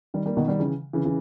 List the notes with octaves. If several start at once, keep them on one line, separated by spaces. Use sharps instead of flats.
D#3 G3
G3 A#3
B2 D#3
D#3 G3
C#3 E3
C#3 E3
C#3 E3